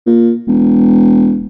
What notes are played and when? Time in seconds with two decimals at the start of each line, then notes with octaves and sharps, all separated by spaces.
0.06 A#2
0.48 E1